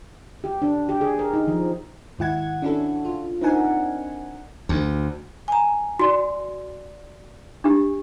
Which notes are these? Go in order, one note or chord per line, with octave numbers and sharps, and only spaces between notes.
G4
D4
G4
G#4
A#4
D#4
F3
D#2 G#2 E4 F#5 G#6
C#4 D4 E4 F#4 A4
F4
C4 D4 D#4 A#4 F#5 G#5
D2
G#5 A#5
F#4 D5 C6
D4 G4